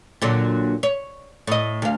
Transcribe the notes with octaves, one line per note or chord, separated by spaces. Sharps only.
A#2 D3 F#3
C#5
A2 D#5
D2 F5